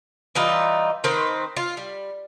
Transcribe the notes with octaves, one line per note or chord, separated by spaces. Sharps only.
E3 G3 D#4 F4
D#3 C4 B4 C5
F4
G3